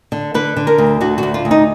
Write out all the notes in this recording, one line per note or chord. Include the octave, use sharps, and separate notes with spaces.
D3
D3 B4
D3
A#4
D2
D3 F#4
F#4
D2
F4
D2
D#4